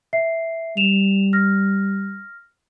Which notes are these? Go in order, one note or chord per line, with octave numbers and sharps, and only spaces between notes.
E5 C7
G3 E7 F7
F6 A#6